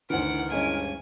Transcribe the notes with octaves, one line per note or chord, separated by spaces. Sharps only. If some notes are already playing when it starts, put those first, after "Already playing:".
D2 D#3 E3 A#4 F#5
G2 G#3 C#4 G#5